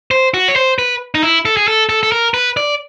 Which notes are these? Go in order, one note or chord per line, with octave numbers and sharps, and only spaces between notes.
C5
F#4
C#5
C5
B4
D#4
E4
A4
G#4
A4
A4
A4
A#4
B4
D5